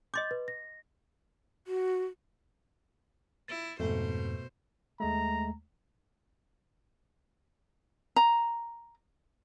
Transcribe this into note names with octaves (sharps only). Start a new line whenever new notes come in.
D#5 C6 D6 G6 A6
B4
A#6
F#4
E4 A6
F2 G#2 B2 A3 C5
D#2 G#3 A3 A#5
A#5